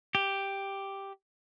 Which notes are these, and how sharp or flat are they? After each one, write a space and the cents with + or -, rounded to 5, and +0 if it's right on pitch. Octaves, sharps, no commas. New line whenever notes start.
G4 +0